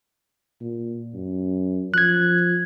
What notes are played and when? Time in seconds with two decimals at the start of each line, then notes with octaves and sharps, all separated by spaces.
0.61 A#2
1.14 F#2
1.94 F3 F#6 G#6